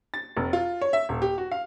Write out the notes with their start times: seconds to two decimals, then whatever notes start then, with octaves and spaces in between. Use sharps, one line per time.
0.14 A6
0.37 F1
0.53 F4
0.81 C#5
0.93 E5
1.09 D#1
1.22 G4
1.38 F#4
1.51 F5